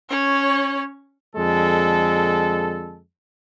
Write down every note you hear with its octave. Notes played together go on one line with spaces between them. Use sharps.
C#4 C#5
F2 D3 G#3 A4